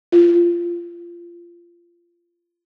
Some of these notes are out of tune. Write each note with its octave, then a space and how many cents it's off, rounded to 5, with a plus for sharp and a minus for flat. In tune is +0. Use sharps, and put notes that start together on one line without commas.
F4 -20